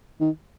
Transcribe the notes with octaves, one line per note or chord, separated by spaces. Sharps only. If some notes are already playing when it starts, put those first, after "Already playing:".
D#3